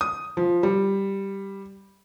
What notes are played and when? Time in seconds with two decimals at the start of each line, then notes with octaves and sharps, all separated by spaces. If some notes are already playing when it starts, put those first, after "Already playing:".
0.01 D#6
0.37 F3
0.63 G3